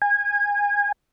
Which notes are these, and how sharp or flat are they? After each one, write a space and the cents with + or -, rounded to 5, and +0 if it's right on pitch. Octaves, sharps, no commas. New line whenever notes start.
G#5 -25